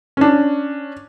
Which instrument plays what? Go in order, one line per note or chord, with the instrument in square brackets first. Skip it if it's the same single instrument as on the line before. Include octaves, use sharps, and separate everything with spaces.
[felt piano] C#4 D4